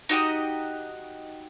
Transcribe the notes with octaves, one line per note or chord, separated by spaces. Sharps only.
D#4 F#4 G4 D#5